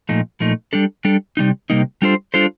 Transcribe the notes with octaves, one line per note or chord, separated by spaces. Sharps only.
A#2 F3 A3 D#4
A#2 F3 A3 D#4
G3 D4 A4
G3 D4 A4
C3 G3 A#3 D#4
C3 G3 A#3 D#4
G3 D4 F4 A4 C5
G3 D4 F4 A4 C5